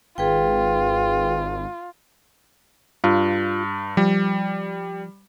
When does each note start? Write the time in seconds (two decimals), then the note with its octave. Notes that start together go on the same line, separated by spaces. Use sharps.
0.18 G#1 F4 G#4 B4 G5
3.04 G2 F4
3.97 F3 G3